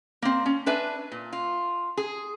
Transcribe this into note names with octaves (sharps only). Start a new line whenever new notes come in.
A#3 C4
C#4
D4 B4 E5 G#5
A#2
F4
G#4